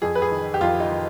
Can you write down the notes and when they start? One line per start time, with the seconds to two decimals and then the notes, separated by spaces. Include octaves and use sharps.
0.02 F2 G#4
0.15 B4
0.22 G#4
0.31 D#3
0.54 G4
0.61 F2 F4
0.80 D#4
0.90 D#3